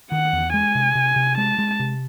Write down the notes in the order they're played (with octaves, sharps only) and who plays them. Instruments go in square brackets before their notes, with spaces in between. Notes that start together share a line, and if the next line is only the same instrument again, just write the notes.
[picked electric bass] D#3 [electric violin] F#5
[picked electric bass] E2
[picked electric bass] G#3 [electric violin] G#5
[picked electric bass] C3
C3
C3
[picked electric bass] G#3 [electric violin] A5
[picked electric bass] G#3
C3